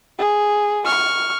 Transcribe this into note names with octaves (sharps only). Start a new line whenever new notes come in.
G#4
C#6 F6